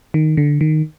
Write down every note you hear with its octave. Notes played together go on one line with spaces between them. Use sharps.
D#3
D3
D#3